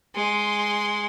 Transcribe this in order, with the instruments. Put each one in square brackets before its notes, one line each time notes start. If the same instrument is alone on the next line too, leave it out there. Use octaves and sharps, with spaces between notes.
[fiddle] G#3 C6